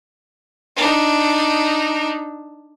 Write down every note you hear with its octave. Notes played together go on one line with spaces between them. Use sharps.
D4 D#4